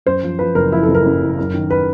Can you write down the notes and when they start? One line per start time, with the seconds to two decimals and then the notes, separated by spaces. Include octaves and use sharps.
0.06 F#2 C5
0.23 F3
0.39 F3 B4
0.55 F#1 A#4
0.72 F3 E4
0.83 F#1 A4
0.95 A#4
1.05 F#2
1.21 C#3
1.38 F#2
1.54 D#3
1.70 B4